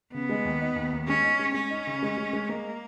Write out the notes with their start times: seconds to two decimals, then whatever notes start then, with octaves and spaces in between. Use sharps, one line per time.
0.14 C#3 B3
0.29 G#3
0.45 D#2
0.61 D#4
0.76 D#2
0.93 D#2
1.07 G#3 C#4
1.24 D#4
1.39 G#3
1.54 G#3 C#4
1.70 D#4
1.87 C#3
2.03 G#3
2.18 G#3
2.33 G#3
2.49 G#3 A#3